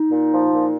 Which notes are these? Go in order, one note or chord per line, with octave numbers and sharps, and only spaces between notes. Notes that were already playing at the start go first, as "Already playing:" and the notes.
Already playing: D#4
A#2
F3
A#2